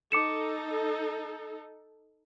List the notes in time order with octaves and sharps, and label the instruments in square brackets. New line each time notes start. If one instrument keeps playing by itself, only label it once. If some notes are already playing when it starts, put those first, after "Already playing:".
[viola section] D#4 A4 [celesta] D6 C#7 E7